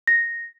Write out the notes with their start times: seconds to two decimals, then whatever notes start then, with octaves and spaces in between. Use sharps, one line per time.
0.07 A#6